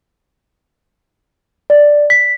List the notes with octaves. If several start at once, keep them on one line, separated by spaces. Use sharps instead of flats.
D5
B6